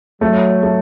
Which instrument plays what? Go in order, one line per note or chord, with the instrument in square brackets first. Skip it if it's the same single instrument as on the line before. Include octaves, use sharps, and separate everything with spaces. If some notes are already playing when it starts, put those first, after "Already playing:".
[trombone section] F#3 [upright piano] A3
[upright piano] A3